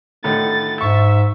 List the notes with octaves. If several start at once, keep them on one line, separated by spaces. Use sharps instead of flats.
A2 D3 D#3 A6
G#2 E5 C#6